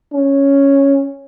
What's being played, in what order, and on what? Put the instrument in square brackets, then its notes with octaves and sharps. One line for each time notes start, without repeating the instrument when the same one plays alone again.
[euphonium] C#4